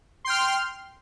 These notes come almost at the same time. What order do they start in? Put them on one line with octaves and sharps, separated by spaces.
C6 G5 F6